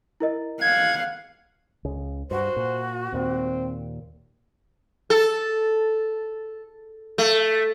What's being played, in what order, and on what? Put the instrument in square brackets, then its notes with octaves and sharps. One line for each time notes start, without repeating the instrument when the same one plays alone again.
[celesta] E4 A#4 D#5
[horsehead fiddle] F5 F#5 [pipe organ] G#6
[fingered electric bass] C#2 C#3
[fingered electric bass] G2 [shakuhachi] F#4 [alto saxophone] C5
[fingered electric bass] A#2
[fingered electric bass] D#2 A#2 [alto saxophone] C4
[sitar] A4
A3